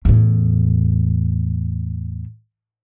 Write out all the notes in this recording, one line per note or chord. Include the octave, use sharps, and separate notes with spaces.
E2 A2